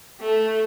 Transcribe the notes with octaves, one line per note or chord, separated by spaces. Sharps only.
A3